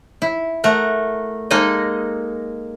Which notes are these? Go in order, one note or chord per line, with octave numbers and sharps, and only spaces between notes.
E4
A3 A#4 F#5
G#3 A#3 D#4 A4 D#5